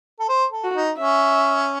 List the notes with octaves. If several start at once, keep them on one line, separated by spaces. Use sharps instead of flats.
A4
C5
A4
F#4
D#4
C#4 E5